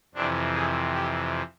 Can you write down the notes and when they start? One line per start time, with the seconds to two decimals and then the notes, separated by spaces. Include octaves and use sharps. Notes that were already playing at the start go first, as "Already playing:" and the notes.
0.15 F2 C3 E3 D4
0.54 G#4
0.94 G4